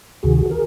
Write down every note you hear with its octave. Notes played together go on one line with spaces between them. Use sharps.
D2 C3 D#3 F#4 G#4
G#4 A#4